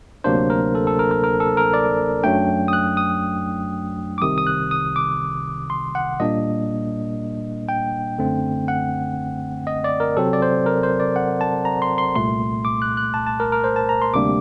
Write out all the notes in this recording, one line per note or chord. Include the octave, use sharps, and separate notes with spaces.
D2 C3 F#3 A#3 D4 C5
A#4
A4
A4
A#4
A#4
A#4
A4
A#4
D5
F#2 F#3 A3 D4 G5
D#6
F#6
D#6
D6
C2 C3 D#3 D#6
D#6
F#6
D#6
D6
C6
F#5
A#2 G3 A#3 D4 D#5
G5
F#2 D3 A3 C4
F#5
D#5
D5
A#4
C3 F#3 C4 A4
D5
C5
A#4
C5
D5
F#5
A5
A#5
C6
C6
C2 A#2 A3 C6
D6
F#6
F#6
A5
A5
A#4
A#4
C5
A5
A#5
C6
D2 C3 G3 A#3 D4 D6